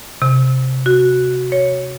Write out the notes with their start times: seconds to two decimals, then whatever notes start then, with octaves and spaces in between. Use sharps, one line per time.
0.22 C3
0.86 F#4
1.52 C#5